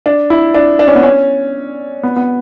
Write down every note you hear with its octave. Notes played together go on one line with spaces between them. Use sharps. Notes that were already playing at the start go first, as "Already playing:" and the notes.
D4
E4
D4
D4
C#4
B3
C#4
B3
B3